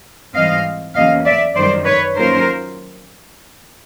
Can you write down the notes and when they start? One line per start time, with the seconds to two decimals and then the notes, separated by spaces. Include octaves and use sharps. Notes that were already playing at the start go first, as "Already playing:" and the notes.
0.34 G#2 E3 G3 C4 D#5 F5
0.94 E2 C#3 F#3 A#3 C#4 D#5 F5
1.25 D5 E5
1.55 F#2 D#3 G3 C5 D5
1.85 B4 C#5
2.16 D#3 F#3 A#3 C#4 F4 A#4 C5